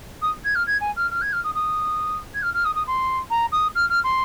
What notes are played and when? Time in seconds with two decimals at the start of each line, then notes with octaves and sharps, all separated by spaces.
0.22 D#6
0.44 G#6
0.55 F6
0.67 G#6
0.81 G#5
0.96 F6
1.11 F6
1.21 G#6
1.32 F6
1.44 D#6
1.55 D#6
2.34 G#6
2.42 F6
2.54 F6
2.64 D#6
2.75 D#6
2.87 C6
3.30 A#5
3.52 D#6
3.75 F6
3.89 F6
4.04 C6